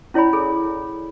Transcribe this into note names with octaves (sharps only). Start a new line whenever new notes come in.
C#4 E4 C#5 D5 G#5 B5
G#4 A4